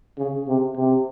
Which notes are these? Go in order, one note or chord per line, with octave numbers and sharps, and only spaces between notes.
C#3
C3
C3